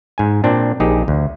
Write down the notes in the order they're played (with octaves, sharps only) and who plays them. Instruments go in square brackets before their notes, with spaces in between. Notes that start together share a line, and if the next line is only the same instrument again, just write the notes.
[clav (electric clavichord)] G#2 G#5
A#2 C4 D4
A#1 D#4 G4 G#4
D2